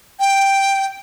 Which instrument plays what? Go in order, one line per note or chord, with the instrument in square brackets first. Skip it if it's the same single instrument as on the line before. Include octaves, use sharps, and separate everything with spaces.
[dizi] G5